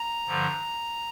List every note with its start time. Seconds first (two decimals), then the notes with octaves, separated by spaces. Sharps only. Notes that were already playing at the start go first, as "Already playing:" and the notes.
Already playing: A#5
0.26 G2 D3 F3